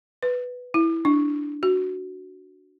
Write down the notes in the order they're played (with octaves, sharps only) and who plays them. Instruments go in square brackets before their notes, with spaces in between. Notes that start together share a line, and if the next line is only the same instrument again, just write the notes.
[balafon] B4
E4
D4
F#4